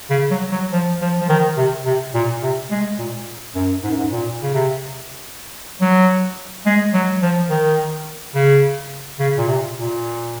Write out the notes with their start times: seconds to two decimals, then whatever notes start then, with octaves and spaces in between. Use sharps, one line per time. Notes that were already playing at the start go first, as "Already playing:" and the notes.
0.10 C#3
0.31 F#3
0.52 F#3
0.73 F3
1.01 F3
1.20 F3
1.29 D#3
1.57 C3
1.85 C3
2.14 A#2
2.43 C3
2.71 G#3
2.99 A#2
3.55 F#2
3.83 G#2
3.91 F#2
3.98 G#2
4.11 A#2
4.42 C#3
4.54 C3
5.81 F#3
6.66 G#3
6.94 F#3
7.22 F3
7.50 D#3
8.35 C#3
9.19 C#3
9.37 A#2
9.48 C3
9.76 A#2